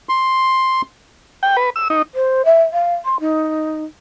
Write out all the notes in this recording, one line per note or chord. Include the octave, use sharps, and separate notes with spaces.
C6
G5
B4
E6
D#4
C5
E5
F5
C6
D#4